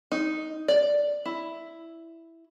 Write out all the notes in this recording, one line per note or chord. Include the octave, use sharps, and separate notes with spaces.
D#4
D5
E4